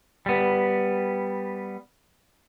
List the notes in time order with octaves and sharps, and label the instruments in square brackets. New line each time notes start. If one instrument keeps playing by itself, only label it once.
[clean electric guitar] G3 B3